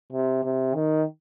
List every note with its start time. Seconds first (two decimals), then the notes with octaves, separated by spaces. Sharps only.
0.13 C3
0.44 C3
0.75 D#3